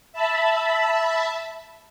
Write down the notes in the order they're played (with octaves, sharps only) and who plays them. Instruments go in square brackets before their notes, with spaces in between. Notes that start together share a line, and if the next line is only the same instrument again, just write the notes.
[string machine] E5 A5 B5